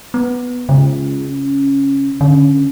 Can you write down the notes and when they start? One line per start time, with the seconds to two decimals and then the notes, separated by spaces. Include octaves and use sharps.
0.14 B3
0.69 C#2 C#3
1.30 C#4
2.21 D3 C#4